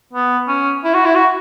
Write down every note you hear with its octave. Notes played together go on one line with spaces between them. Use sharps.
B3
C#4
E4
F#4
E4
F#4